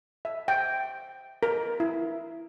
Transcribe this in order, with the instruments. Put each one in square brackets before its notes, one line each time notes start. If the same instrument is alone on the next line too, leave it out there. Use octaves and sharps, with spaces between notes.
[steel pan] E5
G5
A#4
E4